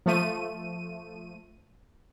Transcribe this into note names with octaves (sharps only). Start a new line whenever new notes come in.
F3 A3 D#7